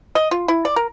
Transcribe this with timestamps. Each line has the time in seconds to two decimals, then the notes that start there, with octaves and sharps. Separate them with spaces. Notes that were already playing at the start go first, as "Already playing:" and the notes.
0.15 D#5
0.31 F4
0.48 E4
0.65 D5
0.76 A#4